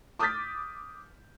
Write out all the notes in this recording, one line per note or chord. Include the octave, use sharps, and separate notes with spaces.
D6 D#6 F6 G6 A6 B6